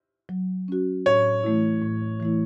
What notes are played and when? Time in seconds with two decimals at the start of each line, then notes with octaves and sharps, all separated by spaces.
0.29 F#3
0.68 C#4 F#4
1.06 A2 C#5
1.44 E3 A3 E4
1.82 A2
2.20 E3 A3 E4